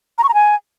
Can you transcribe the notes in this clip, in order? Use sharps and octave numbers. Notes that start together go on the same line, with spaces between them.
A#5
C#6
A#5
G#5